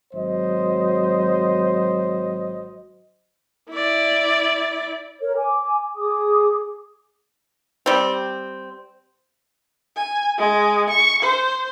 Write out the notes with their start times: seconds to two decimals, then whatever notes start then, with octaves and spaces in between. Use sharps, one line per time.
0.14 G#1 F#3 C5 D#5
3.70 E4 D5
5.21 A#4 C#5
5.36 G#5 D6
5.96 G#4 D6 D#6
7.86 G3 C4
9.96 G#5
10.38 G#3
10.90 C#6
11.22 C5